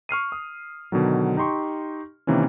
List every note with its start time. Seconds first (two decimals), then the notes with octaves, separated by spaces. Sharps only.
0.09 C#6 F6 C7 D#7
0.32 D#6
0.92 B2 D3 D#3 F#3
1.37 D#4 G4 C6 C#6
2.27 C3 D#3 E3 A#3 C#4